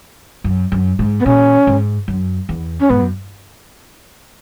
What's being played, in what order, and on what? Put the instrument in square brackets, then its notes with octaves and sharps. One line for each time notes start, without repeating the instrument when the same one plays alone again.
[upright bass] F#2
F#2
G#2
[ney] B3
[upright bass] A#2 [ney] C#4
[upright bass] G#2
F#2
E2
[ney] C#4
[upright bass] G#2 [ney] B3
[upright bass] F#2